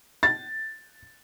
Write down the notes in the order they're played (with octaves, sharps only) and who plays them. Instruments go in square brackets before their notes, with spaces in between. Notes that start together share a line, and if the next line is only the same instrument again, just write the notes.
[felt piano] A6